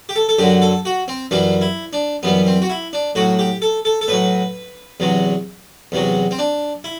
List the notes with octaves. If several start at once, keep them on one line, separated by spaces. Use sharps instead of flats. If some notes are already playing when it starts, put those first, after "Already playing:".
G4
A4
A4
F#2 D3 F#3 G4
A4
F#4
C4
F#2 E3 G3 D4
E4
D4
F#2 E3 G3 B3
C4
F#4
E4
D4
A2 F#3 F#4
G4
A4
A4
A4
A2 F#3 B4
E2 C3 F#3
E2 C3 F#3
C4
D4
E4